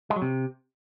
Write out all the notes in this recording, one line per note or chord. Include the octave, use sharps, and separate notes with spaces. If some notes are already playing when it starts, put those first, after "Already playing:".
G#3
F#3
C3